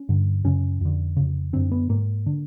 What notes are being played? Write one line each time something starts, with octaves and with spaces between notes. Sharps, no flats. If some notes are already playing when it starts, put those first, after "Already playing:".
Already playing: C#4
G2 D3
F#2 C#3 C#4
F2 D3
F2 C#3
F#2 D3 C4
B3
G#2 A#3
D3